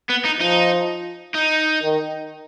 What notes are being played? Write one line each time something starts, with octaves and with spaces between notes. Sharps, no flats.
B3
D#4
F3 D#4
D#4
D#3